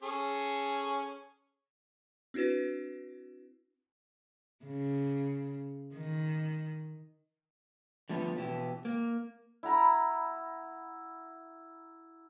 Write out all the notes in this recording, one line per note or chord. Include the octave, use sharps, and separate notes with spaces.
C#4 G#4 A4
C4 D4 E4 F#4 B4
C#3
D#3
D3 F3 G3 A3 B3
B2 E3 G4
A#3
E4 F#5 A#5 B5